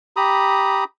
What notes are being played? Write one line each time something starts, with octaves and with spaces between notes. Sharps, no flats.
G4 A#5 B5 D#6